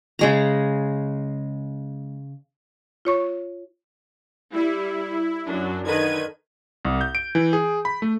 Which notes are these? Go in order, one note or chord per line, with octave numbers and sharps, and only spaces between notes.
C#3 G#3 A#5
F4 C#5 C#6
G3 E4
F#2 F#3 D4
D3 D#3 B4 G#6 D#7
C2
G6
D7
E3
G#4
B5
A3